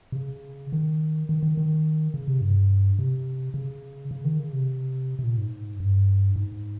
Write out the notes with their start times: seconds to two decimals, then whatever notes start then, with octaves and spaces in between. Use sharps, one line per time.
0.12 C3
0.16 C#3
0.73 D#3
1.29 D#3
1.43 D#3
1.57 D#3
2.14 C#3
2.28 C3
2.41 G2
2.99 C3
3.54 C#3
4.11 C#3
4.24 D#3
4.39 C#3
4.53 C3
5.19 C3
5.24 A#2
5.38 G#2
5.80 G2
6.36 G#2